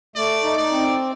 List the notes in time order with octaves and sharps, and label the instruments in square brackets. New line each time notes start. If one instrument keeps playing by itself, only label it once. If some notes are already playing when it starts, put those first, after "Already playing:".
[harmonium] A3 [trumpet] D5
[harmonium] D#4
[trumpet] D5
[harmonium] C4